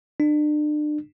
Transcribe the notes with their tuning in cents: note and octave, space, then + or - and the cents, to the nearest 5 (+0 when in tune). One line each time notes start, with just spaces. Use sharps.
D4 +35